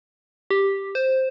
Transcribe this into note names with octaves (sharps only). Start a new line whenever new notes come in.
G4
C5